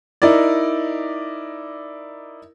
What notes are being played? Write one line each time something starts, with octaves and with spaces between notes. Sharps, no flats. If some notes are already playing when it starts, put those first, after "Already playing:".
D#4 E4 A#4 D5